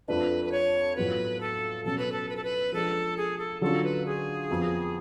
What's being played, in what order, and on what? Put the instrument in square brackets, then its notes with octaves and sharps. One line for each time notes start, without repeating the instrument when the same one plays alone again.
[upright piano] F2 F3 A3 D4 [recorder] B4
[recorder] B4
C#5
[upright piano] A2 F#3 B3 F4 [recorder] B4
[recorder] A4
[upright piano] B2 F#3 C#4 [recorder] A4
[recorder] B4
A4
B4
A4
B4
[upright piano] F3 G#3 D4 [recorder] A4
[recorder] G#4
A4
[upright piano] D3 F#3 C#4 F4 [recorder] A4
[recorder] B4
G#4
[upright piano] F2 F3 B3 F#4